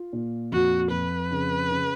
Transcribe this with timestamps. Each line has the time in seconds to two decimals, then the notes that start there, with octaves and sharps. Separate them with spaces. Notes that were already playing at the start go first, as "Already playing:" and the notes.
Already playing: F4
0.13 A#2
0.52 F2 F#4
0.91 F2 B4
1.31 C#3
1.70 C#3